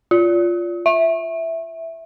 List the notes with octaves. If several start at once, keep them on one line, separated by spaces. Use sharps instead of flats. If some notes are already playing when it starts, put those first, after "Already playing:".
F4
E5